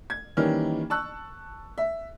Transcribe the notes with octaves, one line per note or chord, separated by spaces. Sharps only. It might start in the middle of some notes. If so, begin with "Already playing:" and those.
G#6
D#3 E3 G3 A#3 C#4
A5 C#6 E6 F#6
E5